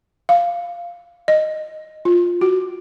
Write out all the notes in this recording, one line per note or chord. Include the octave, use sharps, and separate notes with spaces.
F5
D#5
F4
F#4